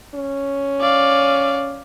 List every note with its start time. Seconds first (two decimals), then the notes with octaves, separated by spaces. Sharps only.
0.15 C#4
0.81 D5 F5